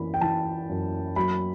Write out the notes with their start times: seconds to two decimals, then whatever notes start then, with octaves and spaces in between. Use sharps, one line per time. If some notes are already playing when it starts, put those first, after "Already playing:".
Already playing: F#2 E3 B5
0.14 G5
0.21 E3 A5
0.69 F#2
1.16 F#3 B5